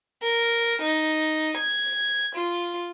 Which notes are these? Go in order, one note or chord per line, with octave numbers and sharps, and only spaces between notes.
A#4
D#4
G#6
F4